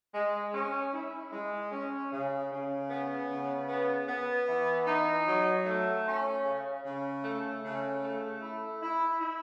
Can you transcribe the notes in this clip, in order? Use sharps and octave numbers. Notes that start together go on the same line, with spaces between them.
G#3
C#4
E4
G#3
C#4
C#3
C#3
B3
C#3
B3
B3
E3
D#4
F#3
A3
C#4
C#3
C#3
A3
C#3
A3
E4
E4
E4